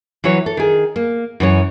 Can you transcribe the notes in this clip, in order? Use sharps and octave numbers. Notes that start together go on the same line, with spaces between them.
E3 F#3 B4 C#5
A4
D#3 G#4
A#3
F#2 E3 C#5